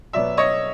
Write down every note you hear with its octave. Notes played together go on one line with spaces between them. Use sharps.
B2 F#3 B3 D5 E5
C#5 D#5